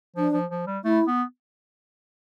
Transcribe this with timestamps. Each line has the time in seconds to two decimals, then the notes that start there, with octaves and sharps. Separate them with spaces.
0.16 F3 D4
0.34 F3
0.51 F3
0.67 G3
0.84 A3 E4
1.07 B3